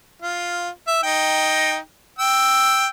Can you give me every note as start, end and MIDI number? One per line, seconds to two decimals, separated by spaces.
0.22 0.69 65
0.88 1.01 76
1.03 1.77 63
1.03 1.77 79
2.19 2.87 79
2.19 2.87 88